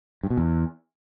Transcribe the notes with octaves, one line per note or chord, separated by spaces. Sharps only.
G2
B2
E2